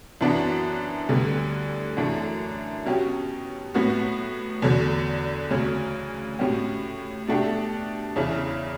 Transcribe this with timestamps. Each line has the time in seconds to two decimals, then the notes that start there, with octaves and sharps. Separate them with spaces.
0.21 F#2 E3 B3 D4 F#4
1.09 D2 D3 G3 B3
1.97 F#2 E3 A3 D4
2.86 B2 F#3 C#4 G4
3.74 A2 F#3 B3 F#4
4.62 E2 D3 F#3
5.51 D2 C#3 F#3
6.39 A2 F#3 C#4 G4
7.27 B2 A3 D4 G4
8.16 E2 C#3 E3